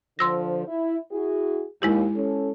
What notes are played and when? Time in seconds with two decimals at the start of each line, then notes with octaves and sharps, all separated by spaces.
0.19 D3 F3 C5 C6 E6 A#6
0.67 E4
1.12 E4 F#4 G#4
1.82 D#2 G#3 E4 G4
2.15 C#4 A4